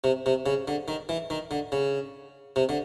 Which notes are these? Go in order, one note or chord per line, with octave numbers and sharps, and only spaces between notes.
C3
C3
C#3
D3
D#3
E3
D#3
D3
C#3
C3
D3